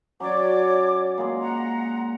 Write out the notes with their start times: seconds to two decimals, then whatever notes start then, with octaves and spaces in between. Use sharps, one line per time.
0.20 F#3 C#4 C#5 D5 D6
1.18 A#2 G#3 C6
1.41 F#5 A#5